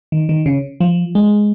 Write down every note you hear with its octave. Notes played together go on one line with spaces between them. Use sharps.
D#3
D#3
C#3
F3
G#3